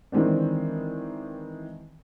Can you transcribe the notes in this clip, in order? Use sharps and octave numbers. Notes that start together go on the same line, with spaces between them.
D#3 E3 G#3 C4 D4